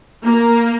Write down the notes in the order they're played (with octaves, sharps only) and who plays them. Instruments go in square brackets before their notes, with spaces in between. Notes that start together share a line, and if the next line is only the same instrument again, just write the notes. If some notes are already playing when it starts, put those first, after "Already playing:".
[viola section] A#3